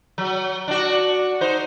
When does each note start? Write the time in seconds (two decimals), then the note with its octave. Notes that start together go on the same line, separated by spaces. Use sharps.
0.18 F#3
0.68 D4 F#4
1.41 D#4 C5